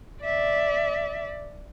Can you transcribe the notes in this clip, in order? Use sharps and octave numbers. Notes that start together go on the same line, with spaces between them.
D5 E5